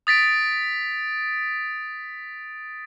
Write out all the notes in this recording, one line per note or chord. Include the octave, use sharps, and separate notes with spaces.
D#6 A6 B6 D7